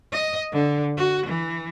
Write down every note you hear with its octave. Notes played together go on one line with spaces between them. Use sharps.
D#5
D3
F#4
E3